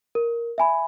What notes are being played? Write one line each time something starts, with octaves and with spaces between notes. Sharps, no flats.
A#4
E5 G#5 B5